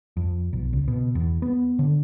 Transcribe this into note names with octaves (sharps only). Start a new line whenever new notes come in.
F2
B1
C#2
B2
E2
B3
D3